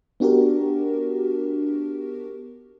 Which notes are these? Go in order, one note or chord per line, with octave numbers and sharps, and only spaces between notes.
B3 D4 F#4 G4 A#4